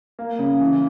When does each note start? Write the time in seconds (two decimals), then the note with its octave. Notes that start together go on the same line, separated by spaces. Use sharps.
0.19 A#3
0.39 C#3
0.60 E3